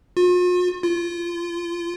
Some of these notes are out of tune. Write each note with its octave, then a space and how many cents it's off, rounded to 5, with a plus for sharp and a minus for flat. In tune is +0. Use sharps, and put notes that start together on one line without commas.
F4 +45
F4 -25